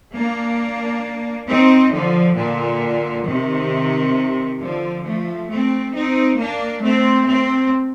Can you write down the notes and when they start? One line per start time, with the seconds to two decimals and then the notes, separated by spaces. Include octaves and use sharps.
0.15 A#3 D4
1.49 C4 D#4
1.94 D3 F3
2.38 A#2 D3
3.27 C3 D#3
4.61 D3 F3
5.05 F3 A3
5.50 A3 C4
5.94 C4 D#4
6.39 A#3 D4
6.83 A3 C4
7.28 A3 C4